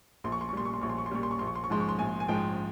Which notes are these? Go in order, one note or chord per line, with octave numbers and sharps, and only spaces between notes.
A#1 C6
C#6
C6
C#6
A#2 G3 C6
C#6
C6
A#1 C#6
C6
C#6
C6
A#2 G3 C#6
C6
C#6
A#1 C6
C#6
C6
C#6
G#2 F3 G#3 C6
C#6
C6
A#1 G#5
G#5
G#2 F3 G#3 G5